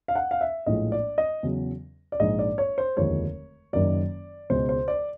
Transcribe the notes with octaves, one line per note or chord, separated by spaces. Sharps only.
F5
F#5
F5
E5
A#1 A2 F3 G#3 D#5
D5
D#5
E2 C#3 F#3
D5
A#1 G#2 F3 G#3 D#5
D5
C#5
C5
F1 D#2 D3 F3 G#3 C#5
F#1 F#2 D#3 F#3 D5
C#2 B2 G#3 C5
C5
D5